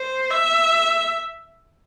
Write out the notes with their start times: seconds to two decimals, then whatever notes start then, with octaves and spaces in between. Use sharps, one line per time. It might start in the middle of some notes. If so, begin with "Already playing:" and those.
Already playing: C5
0.31 E5